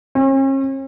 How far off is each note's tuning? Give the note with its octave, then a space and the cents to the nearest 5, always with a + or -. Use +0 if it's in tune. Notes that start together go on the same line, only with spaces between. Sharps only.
C#4 -45